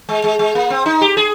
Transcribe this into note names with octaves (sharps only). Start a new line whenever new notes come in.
G#3
G#3
G#3
A#3
C4
D#4
G4
G#4